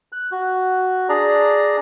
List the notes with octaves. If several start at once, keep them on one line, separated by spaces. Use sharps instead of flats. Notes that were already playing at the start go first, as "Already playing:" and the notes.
F#6
F#4
D4 G#4 D5 A#5